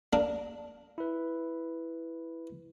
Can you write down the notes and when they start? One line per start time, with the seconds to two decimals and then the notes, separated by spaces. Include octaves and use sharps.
0.13 A#3 D4 A#4
0.98 E4 B4